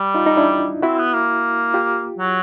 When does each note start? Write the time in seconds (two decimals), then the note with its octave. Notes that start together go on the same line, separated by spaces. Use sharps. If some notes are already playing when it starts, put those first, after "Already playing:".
Already playing: G3
0.15 D#4 F4
0.26 D#4
0.37 D4 E4
0.82 C4 E4 F#4
0.98 B3
1.14 A#3
1.74 F4 G4
2.19 F#3